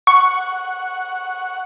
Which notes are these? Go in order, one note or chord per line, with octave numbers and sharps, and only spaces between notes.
F#5 C#6